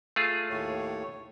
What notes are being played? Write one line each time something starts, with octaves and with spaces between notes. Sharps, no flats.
A3 F4 G#4
D#2 A2 C#5